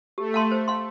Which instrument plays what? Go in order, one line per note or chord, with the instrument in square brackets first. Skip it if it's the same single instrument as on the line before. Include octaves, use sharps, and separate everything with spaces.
[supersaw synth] A3 [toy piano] G4
[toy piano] F5 A5 C6
C5
F5 C6